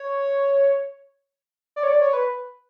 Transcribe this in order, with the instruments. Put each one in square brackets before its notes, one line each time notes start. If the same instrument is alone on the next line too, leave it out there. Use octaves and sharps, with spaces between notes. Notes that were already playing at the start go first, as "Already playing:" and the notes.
Already playing: [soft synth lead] C#5
D5
C#5
D5
C#5
B4